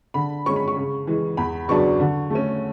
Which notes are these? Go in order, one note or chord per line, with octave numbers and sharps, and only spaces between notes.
D3 B5
G#3 C#4 C#6
B5
C#6
C#3
E3 G#3
E2 B5
C#3 F#3 B3 D4 C#6
D3
A3 C#4